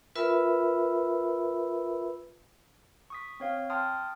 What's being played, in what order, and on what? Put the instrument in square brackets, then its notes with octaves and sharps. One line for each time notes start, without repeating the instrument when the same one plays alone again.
[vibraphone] F4 A#4 B4 E5 B5 E6
[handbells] C#6 D#6 B6
C4 C#5 F5
G5 A5 C6 D#6 F6